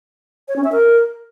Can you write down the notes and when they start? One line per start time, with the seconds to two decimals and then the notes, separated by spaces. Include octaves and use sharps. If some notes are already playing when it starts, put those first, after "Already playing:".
0.48 C#5
0.56 C#4
0.64 E5
0.72 A#4